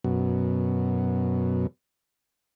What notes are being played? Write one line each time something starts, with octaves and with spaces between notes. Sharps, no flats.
F#2 B2